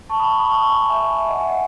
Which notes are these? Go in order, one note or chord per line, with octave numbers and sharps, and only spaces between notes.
A5 C#6
B5 D#6
B5 D#6
A5 C#6
G#5 B5
E5 G#5
D#5 F#5
E5 G#5
D#5 F#5